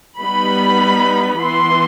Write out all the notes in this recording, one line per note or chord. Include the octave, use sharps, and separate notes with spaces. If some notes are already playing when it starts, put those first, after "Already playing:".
G3 B3 D#4 B5
E3 B3 E4 C6